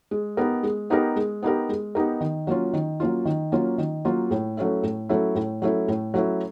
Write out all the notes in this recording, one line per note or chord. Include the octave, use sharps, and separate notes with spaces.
G#3
B3 D#4 G4 A#4
G#3
B3 D#4 G4 A#4
G#3
B3 D#4 G4 A#4
G#3
B3 D#4 G4 A#4
D#3
F#3 A#3 C#4 F4
D#3
F#3 A#3 C#4 F4
D#3
F#3 A#3 C#4 F4
D#3
F#3 A#3 C#4 F4
A2
F#3 A3 C#4 E4
A2
F#3 A3 C#4 E4
A2
F#3 A3 C#4 E4
A2
F#3 A3 C#4 E4